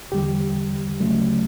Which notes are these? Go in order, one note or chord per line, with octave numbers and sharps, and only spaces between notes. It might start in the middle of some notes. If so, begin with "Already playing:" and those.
E2 D3 G3 G4
D2 C#3 F#3 A3